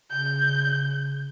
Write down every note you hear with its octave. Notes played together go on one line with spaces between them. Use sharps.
C#3 G6